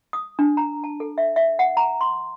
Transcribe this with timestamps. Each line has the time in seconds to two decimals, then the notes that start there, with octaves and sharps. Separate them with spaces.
0.13 D#6
0.39 D4
0.57 A#5
0.84 A5
1.00 A4
1.18 E5
1.36 E5
1.59 F#5
1.77 A#5
2.01 C6